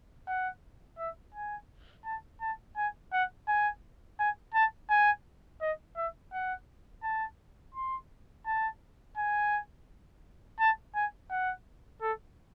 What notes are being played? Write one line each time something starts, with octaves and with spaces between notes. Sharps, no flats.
F#5
E5
G#5
A5
A5
G#5
F#5
G#5
G#5
A5
G#5
D#5
E5
F#5
A5
C6
A5
G#5
A5
G#5
F#5
A4